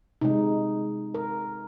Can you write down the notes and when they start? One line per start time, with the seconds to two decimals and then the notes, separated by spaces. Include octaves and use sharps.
0.21 C3 G#3 D#4
1.14 A#4